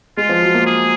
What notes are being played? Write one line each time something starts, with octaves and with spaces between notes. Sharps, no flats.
G#3 F4
F3
F#3
A#3
G#4